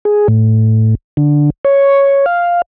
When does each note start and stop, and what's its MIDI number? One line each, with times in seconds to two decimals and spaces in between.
0.05 0.28 68
0.28 0.95 45
1.17 1.50 50
1.65 2.26 73
2.26 2.62 77